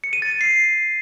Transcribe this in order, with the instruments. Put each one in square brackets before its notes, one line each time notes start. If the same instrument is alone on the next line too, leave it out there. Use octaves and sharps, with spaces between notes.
[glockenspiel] C#7
D#7
A6
D#7
C7